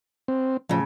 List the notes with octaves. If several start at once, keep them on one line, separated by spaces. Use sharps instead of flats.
C4
A2 C#3 F3